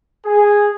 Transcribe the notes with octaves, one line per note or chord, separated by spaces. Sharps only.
G#4